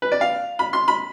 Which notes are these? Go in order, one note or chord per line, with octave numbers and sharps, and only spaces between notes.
B4
D5
F5
B5
C6
B5